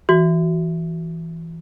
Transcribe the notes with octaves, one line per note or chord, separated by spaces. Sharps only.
E3 F#4